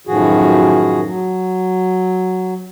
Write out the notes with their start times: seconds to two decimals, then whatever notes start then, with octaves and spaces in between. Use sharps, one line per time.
0.07 F#2 A2 D#3 F3 F#4 G#4
1.04 F#3